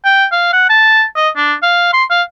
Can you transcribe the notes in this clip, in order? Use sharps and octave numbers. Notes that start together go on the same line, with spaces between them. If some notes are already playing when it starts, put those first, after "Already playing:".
G5
F5
F#5
A5
D#5
D4
F5
C6
F5